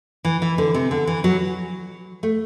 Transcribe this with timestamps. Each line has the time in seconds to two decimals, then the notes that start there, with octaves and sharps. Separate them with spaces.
0.25 E3
0.42 E3
0.58 D3
0.74 C3
0.91 D3
1.07 E3
1.24 F#3
2.23 A3